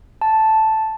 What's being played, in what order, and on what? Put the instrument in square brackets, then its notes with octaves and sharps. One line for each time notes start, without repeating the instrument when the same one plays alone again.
[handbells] A5